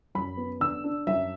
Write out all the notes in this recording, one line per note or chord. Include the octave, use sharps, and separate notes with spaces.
F#2 B5
B3
D3 E6
D4
F#2 E5